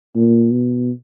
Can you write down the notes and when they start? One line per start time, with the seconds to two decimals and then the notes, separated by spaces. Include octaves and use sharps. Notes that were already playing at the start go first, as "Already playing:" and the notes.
0.15 A#2
0.52 B2